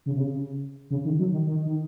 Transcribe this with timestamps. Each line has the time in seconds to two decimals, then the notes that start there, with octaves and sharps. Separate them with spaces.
0.06 C#3
0.15 C3
0.20 C#3
0.90 C#3
1.05 D#3
1.19 F#3
1.32 D#3
1.47 D#3
1.65 D#3